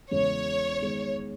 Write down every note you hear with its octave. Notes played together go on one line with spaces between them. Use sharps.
E2 C#3 G#3 C#5
D#3 G#3 B3